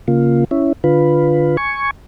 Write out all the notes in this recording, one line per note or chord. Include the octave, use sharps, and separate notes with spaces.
C#3 A#3 F4
C#4 E4
D3 F4 B4
G#5 C#6